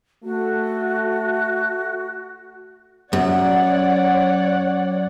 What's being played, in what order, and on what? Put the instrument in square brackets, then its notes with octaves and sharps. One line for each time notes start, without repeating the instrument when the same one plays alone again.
[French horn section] A3 [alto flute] F#4
[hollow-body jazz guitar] F#2 [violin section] C#5 D5 F#5